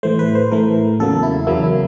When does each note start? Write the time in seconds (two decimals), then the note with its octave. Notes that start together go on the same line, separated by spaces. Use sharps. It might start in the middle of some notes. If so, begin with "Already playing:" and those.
0.03 A2 E3 A3 C5
0.19 B4
0.35 C5
0.52 A2 E3 A3 A#4
0.99 E2 C#3 F#3 A#3 A4
1.23 E4
1.47 E2 C#3 F#3 A#3 E4
1.64 E4